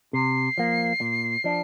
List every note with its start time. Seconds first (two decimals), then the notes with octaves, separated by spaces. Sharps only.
0.13 C3 C7
0.58 F3 A#3
1.01 A#2
1.44 F3 D4